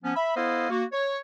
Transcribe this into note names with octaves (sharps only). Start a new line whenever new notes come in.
F3 B3 C#4
E5 B5
B3 E4 A4 C5 D#5 F5
A#3 F#4
C#5